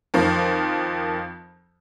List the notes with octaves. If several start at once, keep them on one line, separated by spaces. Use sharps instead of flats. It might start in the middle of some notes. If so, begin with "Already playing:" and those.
F2 D#3 F3